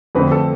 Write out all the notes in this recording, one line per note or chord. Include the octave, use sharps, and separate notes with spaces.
F2 D3 A3 C4 B4
A4